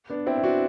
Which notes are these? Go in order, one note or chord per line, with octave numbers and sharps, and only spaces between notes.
B3 D4
C4 E4
E4
D4 F#4